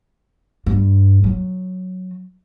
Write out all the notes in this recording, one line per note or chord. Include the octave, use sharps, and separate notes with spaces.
G2
F#3